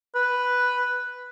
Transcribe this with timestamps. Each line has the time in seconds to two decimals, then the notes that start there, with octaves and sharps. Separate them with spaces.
0.15 B4